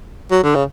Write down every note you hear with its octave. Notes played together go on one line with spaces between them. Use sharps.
F#3
D3
C#3